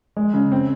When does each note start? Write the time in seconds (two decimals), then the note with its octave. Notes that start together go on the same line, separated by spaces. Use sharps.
0.17 G#3
0.34 C#3
0.52 C4